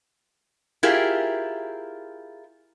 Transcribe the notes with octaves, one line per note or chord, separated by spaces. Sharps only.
E4 F4 G4 G#4 A#4